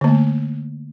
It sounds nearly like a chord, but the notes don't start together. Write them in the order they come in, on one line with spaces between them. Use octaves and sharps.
D3 A#3 A3